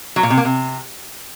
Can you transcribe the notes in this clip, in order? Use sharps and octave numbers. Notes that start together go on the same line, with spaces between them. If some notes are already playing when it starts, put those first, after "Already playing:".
F#3
A#2
C3
A#3
C3